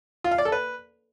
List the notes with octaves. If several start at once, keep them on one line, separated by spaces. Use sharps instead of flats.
F4
F5
D5
A4
B4